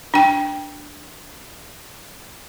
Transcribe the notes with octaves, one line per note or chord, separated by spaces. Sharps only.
D4 G5